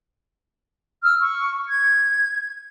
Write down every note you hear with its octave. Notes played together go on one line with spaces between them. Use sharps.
E6 F6
C#6
G#6